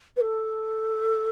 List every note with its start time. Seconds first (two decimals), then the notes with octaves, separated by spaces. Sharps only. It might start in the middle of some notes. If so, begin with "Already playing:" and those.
0.17 B4
0.21 A4